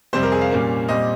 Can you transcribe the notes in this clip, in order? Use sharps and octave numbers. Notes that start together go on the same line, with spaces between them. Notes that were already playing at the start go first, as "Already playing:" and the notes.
F2 C3 G3 C4 C5
A#4
G#4
F5
A#2 G3 A#3 C#4
A#2 G3 C4 D#5